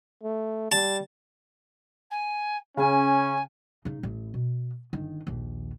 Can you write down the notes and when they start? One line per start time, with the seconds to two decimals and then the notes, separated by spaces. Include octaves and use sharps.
0.23 A3
0.72 G3 A5
2.11 G#5
2.77 C#3 C#4 G#5
3.85 C#3 D#4
4.03 A1
4.34 B2
4.93 G1 D#3
5.27 A#1 D#2